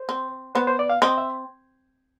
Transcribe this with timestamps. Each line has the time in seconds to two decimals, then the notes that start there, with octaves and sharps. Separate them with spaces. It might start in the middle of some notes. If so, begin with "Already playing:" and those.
Already playing: C5
0.09 C4
0.55 B3 C5
0.67 C5
0.79 D5
0.90 F5
1.02 C4 D#5
1.18 E5